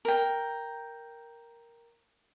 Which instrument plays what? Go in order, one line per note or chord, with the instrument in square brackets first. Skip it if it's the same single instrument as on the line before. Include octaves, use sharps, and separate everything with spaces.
[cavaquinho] A#4 G5